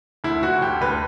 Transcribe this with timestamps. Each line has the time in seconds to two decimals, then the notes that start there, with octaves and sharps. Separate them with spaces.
0.24 D2 E4
0.42 D2 F#4
0.62 D2 G4
0.81 D2 B4